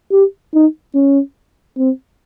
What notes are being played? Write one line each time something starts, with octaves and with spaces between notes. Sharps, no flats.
G4
D#4
C#4
C4